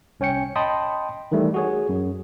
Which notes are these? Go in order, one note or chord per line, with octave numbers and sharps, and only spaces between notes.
C2 C#4 C#5 G5 C#7
D#5 G5 A5 B5 C6 D#6
D#3 E3 G3 A3
F#4 G#4 C#5
F#2